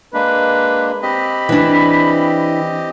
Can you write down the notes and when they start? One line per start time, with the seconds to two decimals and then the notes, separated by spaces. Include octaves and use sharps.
0.14 G#3 A#3 D4 B4
1.03 C4 G4 D#5 B5
1.49 E3 D4